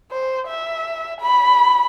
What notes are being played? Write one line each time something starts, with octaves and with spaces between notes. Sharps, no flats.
C5
E5
B5